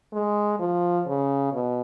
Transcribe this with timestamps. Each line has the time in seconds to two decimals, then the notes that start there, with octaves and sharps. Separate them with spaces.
0.13 G#3
0.59 F3
1.07 C#3
1.53 B2